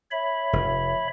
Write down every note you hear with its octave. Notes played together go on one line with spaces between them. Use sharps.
C#5 E5 B5
F1